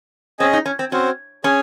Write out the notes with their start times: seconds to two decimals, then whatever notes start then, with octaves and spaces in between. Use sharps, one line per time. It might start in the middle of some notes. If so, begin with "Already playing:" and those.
0.39 C4 C#4 G#4 D#5 G#5
0.53 D#4
0.66 C#4
0.79 C4
0.92 C4 C#4 F#4 C5
1.44 C#4 G#4 C#5 G#5